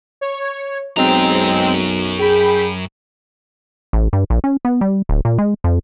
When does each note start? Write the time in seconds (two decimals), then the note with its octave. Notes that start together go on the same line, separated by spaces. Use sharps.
0.21 C#5
0.97 B1 F#2 G#3 C4 A#5
2.19 G#4 G5 B5
3.93 A1
4.13 G2
4.30 A#1
4.44 C#4
4.65 B3
4.81 G3
5.09 D1
5.25 A#2
5.38 G#3
5.64 F2